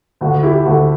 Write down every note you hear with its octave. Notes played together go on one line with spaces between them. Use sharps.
D2 F#4
E4 G4
D2 F#4 A4